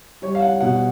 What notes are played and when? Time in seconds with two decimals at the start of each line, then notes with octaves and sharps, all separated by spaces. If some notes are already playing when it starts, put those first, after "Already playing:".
0.22 G3 C#5
0.35 F5
0.42 F#5
0.60 B2 F#5